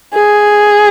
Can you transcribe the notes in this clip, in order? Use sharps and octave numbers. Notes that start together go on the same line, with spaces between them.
G#4